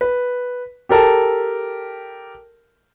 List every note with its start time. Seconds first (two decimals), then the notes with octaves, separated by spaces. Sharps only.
0.01 B4
0.89 G4 A4 A#4 A5